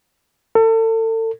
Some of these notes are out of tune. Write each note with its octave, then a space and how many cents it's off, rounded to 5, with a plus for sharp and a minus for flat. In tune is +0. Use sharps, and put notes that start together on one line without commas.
A4 +35